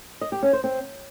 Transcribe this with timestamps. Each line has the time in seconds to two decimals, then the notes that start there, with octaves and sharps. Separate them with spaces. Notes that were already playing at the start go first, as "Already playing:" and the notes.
0.21 D#5
0.32 G4
0.43 C#4
0.53 C5
0.64 C4